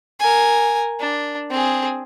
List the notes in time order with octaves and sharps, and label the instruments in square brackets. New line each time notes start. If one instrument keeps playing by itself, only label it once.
[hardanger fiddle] A#4 G#5
D4
C4 G#4